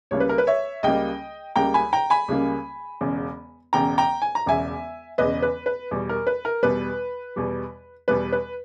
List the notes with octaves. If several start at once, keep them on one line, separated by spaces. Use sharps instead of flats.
C#2 C#3 G3 A#3 C#5
B4
A#4
B4
C#5 E5
C#2 C#3 G3 A#3 D#5 G5
C#2 C#3 G3 A#3 G5 A#5
G#5 B5
G5 A#5
G#5 B5
C#2 C#3 G3 A#3
E1 E2 C#3
E1 E2 C#3 G5 A#5
G5 A#5
G#5
A#5
E1 E2 C#3 E5 G#5
E1 E2 C#3 B4 D#5
B4
B4
E2 B2 G3
A#4
B4
A#4
E2 B2 G3 B4
E2 B2 G3
E2 B2 G3 B4
B4